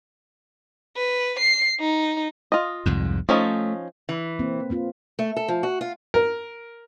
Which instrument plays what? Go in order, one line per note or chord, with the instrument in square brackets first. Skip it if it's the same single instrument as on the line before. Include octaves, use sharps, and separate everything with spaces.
[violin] B4
C7
D#4
[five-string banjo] F4 D#5
[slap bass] C2 F2 G#2
[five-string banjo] F3 C#4 D#4 [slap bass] A3
[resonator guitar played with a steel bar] E3
[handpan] A#3 C4
A#3 C4 F4
[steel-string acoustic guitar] A3
A4
F3
F#4
F4
[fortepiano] A#4